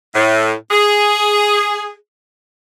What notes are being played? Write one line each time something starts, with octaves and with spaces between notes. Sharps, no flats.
A2
G#4